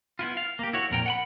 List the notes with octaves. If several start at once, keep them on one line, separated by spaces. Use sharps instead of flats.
B3 E4 F4
F5
A#3 G4
E4 F#4 C#5
F2 A#2 A#4 G5
F#5 G5 B5